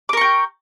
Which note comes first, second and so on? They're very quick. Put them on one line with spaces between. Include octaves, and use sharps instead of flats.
D6 A#4 C#6 G5